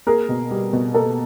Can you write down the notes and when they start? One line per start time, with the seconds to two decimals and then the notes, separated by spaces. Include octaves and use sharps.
0.07 A#3 G#4 A#4
0.29 B2
0.51 G3
0.73 B2
0.94 A#3 A4